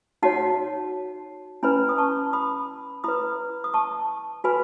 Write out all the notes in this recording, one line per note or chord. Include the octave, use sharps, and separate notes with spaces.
D#4 F#4 C#5 F#5 A5
C#4 E4 B4 G#5 B5
D#6
A5 C#6
B5 D#6
E4 B4 B5 D#6
D#6
A5 C#6
F#4 B4 G#5 B5